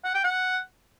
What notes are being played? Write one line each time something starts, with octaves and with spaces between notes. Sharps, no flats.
F#5
G5
F#5